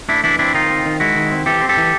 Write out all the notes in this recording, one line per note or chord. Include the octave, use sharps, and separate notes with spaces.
A3 D4 E4
E3 D4 E4
C4 D4 E4
D#3 D#4 F4
C4
D#3
G#3 E4 F#4
D#3
C4
E3 G4 A4
C4
G4 A4
E3